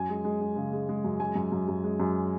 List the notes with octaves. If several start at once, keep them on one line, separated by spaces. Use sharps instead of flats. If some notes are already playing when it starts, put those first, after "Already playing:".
Already playing: F#2 G#5
G#3
G#3
G#3
C#3
G#3
G#3
F#2
G#3 G#5
F#2
F#2
F#2
G#3
F#2